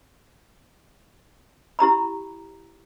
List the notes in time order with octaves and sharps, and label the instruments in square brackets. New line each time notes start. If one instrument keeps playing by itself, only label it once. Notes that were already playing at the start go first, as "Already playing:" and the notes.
[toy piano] E4 G4 A#5 B5